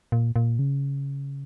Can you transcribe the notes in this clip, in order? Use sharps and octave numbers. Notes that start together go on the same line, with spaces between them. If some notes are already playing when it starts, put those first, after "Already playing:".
A#2
A#2
C#3